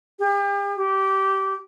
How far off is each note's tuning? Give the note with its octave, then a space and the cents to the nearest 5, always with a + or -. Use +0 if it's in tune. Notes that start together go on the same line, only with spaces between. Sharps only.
G4 +40
G4 -20